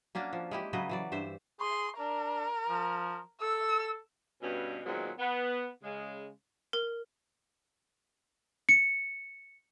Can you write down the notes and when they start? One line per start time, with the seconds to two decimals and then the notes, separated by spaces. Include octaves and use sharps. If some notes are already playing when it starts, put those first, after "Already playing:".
0.15 A#3 C#4 D4 F#4
0.33 F3
0.51 G#3 E4 G4
0.73 C#3 F#3 B4 D#5
0.89 E3 F#3 D5
1.12 G2 C5 E5
1.61 G#4 C6
1.99 D4 A#4
2.69 F3
3.41 A4 E6
4.42 G2 B2 C#4
4.85 A#2 D#3 F#3 G#3 B3 C4
5.19 B3
5.84 C#3 G#3
6.73 A#4
8.69 C#7